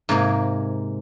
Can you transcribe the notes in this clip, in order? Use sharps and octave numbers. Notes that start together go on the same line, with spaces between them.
G#2 C3 A#3 G#4